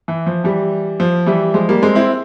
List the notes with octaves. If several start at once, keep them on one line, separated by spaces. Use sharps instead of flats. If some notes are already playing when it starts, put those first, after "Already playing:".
E3
F3
E3 G3
F3
E3 G3
F3 G#3
G3 A#3
G#3 C4
C4 E4